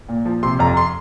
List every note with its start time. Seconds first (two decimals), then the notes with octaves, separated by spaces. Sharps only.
0.09 A#2
0.25 F3
0.43 C3 C6
0.59 F2 A#5
0.77 C6